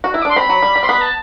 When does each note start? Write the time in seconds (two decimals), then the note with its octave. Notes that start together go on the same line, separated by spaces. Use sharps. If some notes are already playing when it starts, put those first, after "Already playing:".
0.04 F#4
0.14 E4 E6
0.22 D6
0.25 D4 C6
0.36 C4 B5
0.49 F#3
0.62 G3
0.75 G3
0.83 C4 C6
0.88 B3 B5
1.01 A5